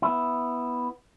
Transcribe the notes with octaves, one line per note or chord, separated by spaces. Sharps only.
B3 E4